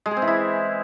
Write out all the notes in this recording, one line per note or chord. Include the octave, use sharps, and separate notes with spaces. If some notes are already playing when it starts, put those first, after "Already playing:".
G#3
G#4
C4
E3
E4